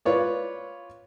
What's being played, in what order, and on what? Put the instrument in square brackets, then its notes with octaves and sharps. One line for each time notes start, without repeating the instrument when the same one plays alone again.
[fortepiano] F4 B4 C#5 D5